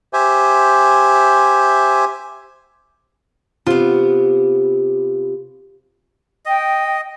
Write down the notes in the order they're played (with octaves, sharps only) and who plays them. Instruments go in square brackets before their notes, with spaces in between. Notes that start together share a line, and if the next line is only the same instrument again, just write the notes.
[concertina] G4 C5 E5 G#5
[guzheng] C3 B3 [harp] F4
[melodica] D#5 [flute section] G5